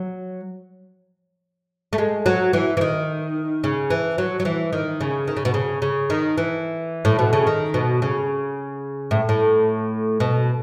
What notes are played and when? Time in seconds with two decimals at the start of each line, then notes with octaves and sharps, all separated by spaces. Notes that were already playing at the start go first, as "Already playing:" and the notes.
Already playing: F#3
1.93 A3
1.98 G#3
2.26 F#3
2.53 E3
2.77 E3
2.81 D#3
3.64 C#3
3.90 E3
4.18 F#3
4.40 F#3
4.45 E3
4.73 D#3
5.01 C#3
5.27 D#3
5.37 C#3
5.45 B2
5.54 C#3
5.82 C#3
6.10 D#3
6.38 E3
7.05 A2
7.19 B2
7.33 C#3
7.47 D#3
7.74 B2
8.02 C#3
9.11 A2
9.29 A2
10.20 B2